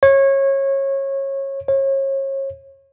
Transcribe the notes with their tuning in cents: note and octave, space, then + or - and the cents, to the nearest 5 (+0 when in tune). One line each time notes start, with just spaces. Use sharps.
C#5 -25
C#5 -35